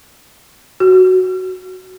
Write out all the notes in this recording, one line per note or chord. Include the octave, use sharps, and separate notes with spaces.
F#4